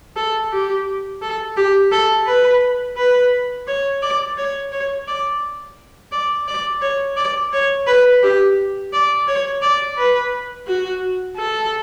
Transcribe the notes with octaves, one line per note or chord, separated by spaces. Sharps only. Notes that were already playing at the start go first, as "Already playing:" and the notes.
A4
G4
A4
G4
A4
B4
B4
C#5
D5
C#5
C#5
D5
D5
D5
C#5
D5
C#5
B4
G4
D5
C#5
D5
B4
F#4
A4